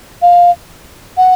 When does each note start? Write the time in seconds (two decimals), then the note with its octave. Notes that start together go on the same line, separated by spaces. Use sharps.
0.22 F5
1.17 F#5